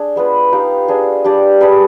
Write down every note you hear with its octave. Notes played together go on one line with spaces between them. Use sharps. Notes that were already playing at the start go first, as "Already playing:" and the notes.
Already playing: D4 G#4
G#3 B3 F4 B4
D#4 G4 B4 F5
B3 D4 G#4
G3 D4 G4 D5
G3 D4 G#4 B4